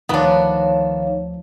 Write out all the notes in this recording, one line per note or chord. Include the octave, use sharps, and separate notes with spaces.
D2 D#3 F3 B3 D4 C#5 F5